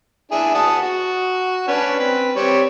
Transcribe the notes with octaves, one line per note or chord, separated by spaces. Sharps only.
D4 E4 G#4
F#5 A5 D#6
F#4
C#4 D4 B4
C4 B4
G3 C4 C#5